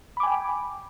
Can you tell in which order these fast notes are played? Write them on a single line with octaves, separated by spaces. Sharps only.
B5 D6 G#5 G5